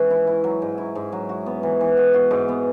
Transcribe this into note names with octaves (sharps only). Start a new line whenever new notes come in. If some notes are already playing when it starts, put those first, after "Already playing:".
Already playing: G#2 E3 C#4
E4
E4
F#3
G#2
E4
G#2
F#3
F#4
B3
E3
E3
F#4
F#4
G#2
B3